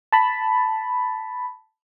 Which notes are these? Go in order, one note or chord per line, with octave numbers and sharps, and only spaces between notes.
A5 B5